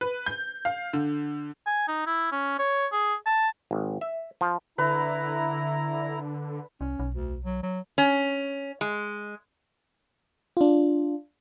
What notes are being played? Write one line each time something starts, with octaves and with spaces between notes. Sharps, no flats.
B4
G6
F5
D3
G#5
D#4
E4
C#4
C#5
G#4
A5
G#1
E5
F3
D3 E4 B4 A#5
C2 C#4
B1
D2
F#3
F#3
C#4
G#3
D4 F4